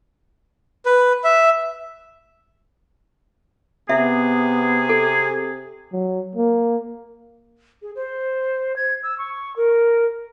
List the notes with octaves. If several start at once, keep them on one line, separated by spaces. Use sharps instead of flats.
B4
E5
C3 B3 G#4 E5
A4
F#3
A#3
G#4
C5
G#6
E6
C#6
A#4